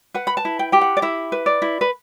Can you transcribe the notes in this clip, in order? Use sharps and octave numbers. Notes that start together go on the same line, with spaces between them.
B4 F#5
B5
A5
E4
G5
G4 G5
F#5
D5
E4 E5
B4
D5
E4
B4